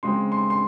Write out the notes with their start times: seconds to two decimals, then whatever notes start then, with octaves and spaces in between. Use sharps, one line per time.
0.03 C#3 G#3 C4 C6
0.32 C6
0.50 C6